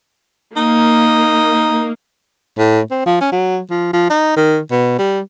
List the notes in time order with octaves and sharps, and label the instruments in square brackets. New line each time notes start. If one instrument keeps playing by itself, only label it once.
[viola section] A#3 [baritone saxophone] D#4
[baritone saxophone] A2
C4
F3
C#4
F#3
F3
F3
D#4
D#3
B2
G3